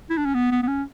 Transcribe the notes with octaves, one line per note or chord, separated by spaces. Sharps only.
E4
D4
C#4
B3
B3
B3
C#4